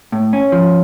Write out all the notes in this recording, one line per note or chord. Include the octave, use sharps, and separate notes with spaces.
A2
C#4
F3